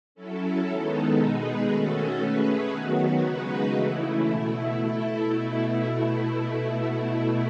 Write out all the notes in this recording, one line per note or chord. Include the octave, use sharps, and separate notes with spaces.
F#3 C#4 E4 A4
D#3 G#3 B3 D#4 A4
B2 G#3 D#4 G#4 B4
D#3 A3 C#4 F#4 A4
A3 C#4 G#4 B4
D#3 F#3 B3 F#4
C#3 G#3 D#4 F#4 B4
C#3 E3 A3 E4
B2 A3 E4
A3 E4 A4
B2 A3 E4